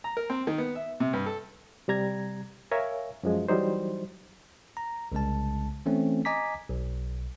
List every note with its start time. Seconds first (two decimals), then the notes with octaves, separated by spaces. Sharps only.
0.04 A#5
0.17 A#4
0.30 C4
0.47 D#3
0.58 B3
0.75 E5
1.00 C3
1.13 G2
1.26 A4
1.88 C3 G3 A#5 G#6
2.71 A#4 C#5 E5 F5 G#5
3.23 F#2 F3 G#3
3.48 E3 F#3 G3 D#4 C5
4.77 A#5
5.12 C2 C#3 G#3 A5
5.86 E3 A3 C4 C#4
6.25 D#5 G#5 A#5 D6 B6
6.69 B1